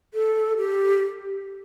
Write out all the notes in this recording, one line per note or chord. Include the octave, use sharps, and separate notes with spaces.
A4
G4